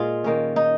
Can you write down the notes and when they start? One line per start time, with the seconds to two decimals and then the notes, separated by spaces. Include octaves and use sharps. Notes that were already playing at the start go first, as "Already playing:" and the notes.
Already playing: A#2 G#3 F4 G#4
0.24 D#3 A#3 C#4
0.56 D#4